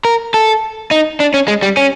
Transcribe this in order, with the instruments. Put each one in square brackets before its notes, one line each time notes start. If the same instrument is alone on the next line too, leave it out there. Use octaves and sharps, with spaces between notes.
[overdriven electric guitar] A#4
A4
D#4
D4
C#4
G#3
G3
C#4